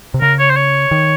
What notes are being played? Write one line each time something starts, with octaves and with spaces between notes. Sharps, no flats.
C3
C#3 A#4
C#5
C5
C#5
D#3